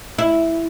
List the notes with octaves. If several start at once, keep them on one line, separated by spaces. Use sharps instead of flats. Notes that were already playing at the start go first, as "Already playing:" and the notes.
E4